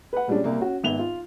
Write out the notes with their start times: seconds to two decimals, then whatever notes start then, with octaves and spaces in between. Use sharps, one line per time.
0.13 B4 F#5
0.28 A#2 G3 G#3 C#4 D4
0.44 C2 A#3
0.60 C#4 F#4
0.84 G#1 B3 E5 F7 G7
0.99 F4